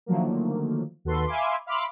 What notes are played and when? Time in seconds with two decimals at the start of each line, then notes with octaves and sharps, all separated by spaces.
0.06 D3 D#3 F3 F#3 A3 A#3
1.04 D#2 F#4 A4 B4 C6
1.27 E5 F5 G#5 B5 C6 D6
1.66 E5 F5 B5 C6 D6